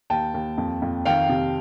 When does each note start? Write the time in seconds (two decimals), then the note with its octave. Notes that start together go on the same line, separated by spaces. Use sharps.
0.10 D#2 G5 A5
0.34 D#2
0.58 F2
0.82 F2
1.05 D#3 F5 G5
1.29 C3